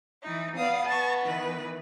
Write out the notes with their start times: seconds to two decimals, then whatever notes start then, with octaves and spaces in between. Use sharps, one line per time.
0.22 E3 D#4
0.56 B3 D5 F5 D#6
0.86 A5 C#6
1.24 D#3 E3 B4